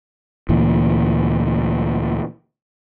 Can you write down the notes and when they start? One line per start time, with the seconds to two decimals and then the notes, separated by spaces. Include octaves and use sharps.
0.49 D2 A#2 E3